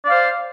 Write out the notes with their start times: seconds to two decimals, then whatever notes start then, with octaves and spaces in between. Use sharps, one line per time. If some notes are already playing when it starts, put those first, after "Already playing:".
0.05 D5
0.08 F5
0.11 C5